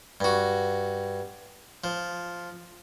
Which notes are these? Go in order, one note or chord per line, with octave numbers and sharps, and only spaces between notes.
G2 F#4
F3